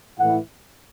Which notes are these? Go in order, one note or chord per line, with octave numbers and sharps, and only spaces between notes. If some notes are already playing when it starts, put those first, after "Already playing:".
A2 E3 F#5